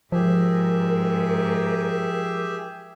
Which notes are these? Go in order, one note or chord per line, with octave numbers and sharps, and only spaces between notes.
G#2 F3 G4 G#4 A#4 E5